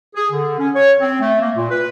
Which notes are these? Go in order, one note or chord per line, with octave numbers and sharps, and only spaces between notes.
G#4
D3
C#4
C#5
C4
A3
A#3
A#2
B4